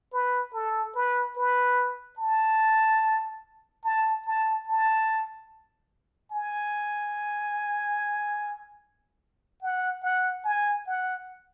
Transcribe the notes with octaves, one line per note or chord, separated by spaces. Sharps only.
B4
A4
B4
B4
A5
A5
A5
A5
G#5
F#5
F#5
G#5
F#5